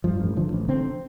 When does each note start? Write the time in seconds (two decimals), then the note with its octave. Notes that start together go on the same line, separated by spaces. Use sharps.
0.04 G2 F3
0.20 A1
0.37 D3 F3
0.53 A1
0.68 D3 C4